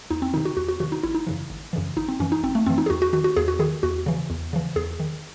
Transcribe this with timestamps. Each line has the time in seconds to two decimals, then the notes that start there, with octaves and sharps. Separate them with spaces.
0.11 E2 D#4
0.22 C4
0.33 C3 D#3 D#4
0.45 F#4
0.57 E2 F#4
0.68 F#4
0.80 C3 D#3 F#4
0.92 D#4
1.03 G#1 E4
1.15 D#4
1.27 F#2 C#3 E3
1.50 G#1
1.73 F#2 C#3 E3
1.96 G#1 D#4
2.08 C4
2.20 F#2 E3 C#4
2.32 D#4
2.43 G#1 C4
2.55 A3
2.66 F#2 E3 C4
2.78 D#4
2.86 G#4
2.90 E2 F#4
3.02 F#4
3.13 D#3 F#4
3.24 F#4
3.37 E2 G#4
3.48 F#4
3.59 D#3 G#4
3.83 E2 F#4
4.06 C#3 E3
4.30 E2
4.53 C#3 E3
4.76 E2 G#4
5.00 D#3